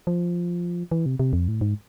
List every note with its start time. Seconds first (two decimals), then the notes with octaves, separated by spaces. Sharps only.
0.07 F3
0.91 E3
1.06 C3
1.19 C3
1.33 F2
1.48 A2
1.61 G#2